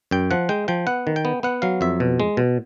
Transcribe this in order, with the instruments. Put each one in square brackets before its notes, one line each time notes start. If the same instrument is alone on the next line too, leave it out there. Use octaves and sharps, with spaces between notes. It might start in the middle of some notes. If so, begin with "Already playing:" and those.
[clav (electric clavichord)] F#2 G5
F3 F#5
G#3 G5
F3 G5
B3 F#5
D#3
G5
B3
B3 F#5
F#3 F5
F2 E5
B2
G#3
B2